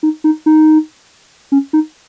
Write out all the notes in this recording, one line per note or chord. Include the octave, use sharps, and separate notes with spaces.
D#4
D#4
D#4
C#4
D#4